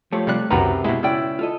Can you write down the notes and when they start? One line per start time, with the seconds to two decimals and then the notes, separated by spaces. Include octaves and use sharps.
0.12 F3 A3 G4 C#5
0.27 C3 G3 F#6
0.50 C#2 F#2 C3 D#3 F#4 B4 A#5
0.84 B2 G#3 E4
1.03 C#2 C#4 E4 D5 G5
1.39 F4 A4 D#5